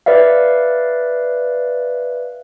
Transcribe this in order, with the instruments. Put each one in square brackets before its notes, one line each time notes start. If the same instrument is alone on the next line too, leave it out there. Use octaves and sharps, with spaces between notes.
[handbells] B4 D5 E5 F5